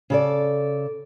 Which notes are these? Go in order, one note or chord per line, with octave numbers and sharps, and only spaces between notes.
C#3 A4 D5